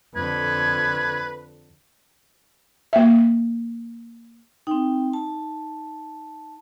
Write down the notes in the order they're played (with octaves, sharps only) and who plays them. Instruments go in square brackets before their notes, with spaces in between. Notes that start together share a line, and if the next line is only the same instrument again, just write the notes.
[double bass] F2 D3 [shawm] B4 [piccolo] G#6
[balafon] A#3 E5
[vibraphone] C4 G5 [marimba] D#4
[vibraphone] A5